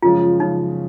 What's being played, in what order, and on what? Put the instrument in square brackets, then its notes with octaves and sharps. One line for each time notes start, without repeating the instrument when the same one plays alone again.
[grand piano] F#2 C#3 F3 G#3 [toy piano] F4
[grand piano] F#2 C#3 F3 G#3 [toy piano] D#4